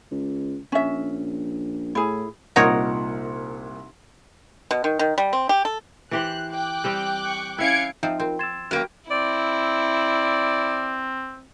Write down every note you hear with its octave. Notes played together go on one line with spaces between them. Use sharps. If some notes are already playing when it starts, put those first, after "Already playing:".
C#2
A#1 C#4 E5
A2 E4 G#4
C2 A#2 D#4 A#4 C#5 F#5
B2
D#3
D#3
G3
C4
G4
A4
E3 G4 C5 F#6
G5 D6 F#6
G3 C4 G4
C#6
C#4 E4 E5 F5 G#6 C#7 D7
F3 C4 D#4 F4 E5
C4 F4 A#4
C6 E6 G#6 A6 E7
F#2 A#3 F#4 G4 B4 D7
C4 E4 D5